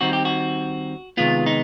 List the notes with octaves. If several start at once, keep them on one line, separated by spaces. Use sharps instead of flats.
D#3 G3 C4 D#4 F#4
G4
F#4
C3 D#3 G#3 B3 F4
D#4